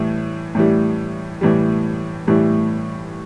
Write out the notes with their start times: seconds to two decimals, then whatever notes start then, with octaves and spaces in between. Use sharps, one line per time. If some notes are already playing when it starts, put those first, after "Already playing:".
Already playing: A2 E3 G3
0.55 A2 E3 G3
1.41 A2 E3 G3
2.27 A2 E3 G3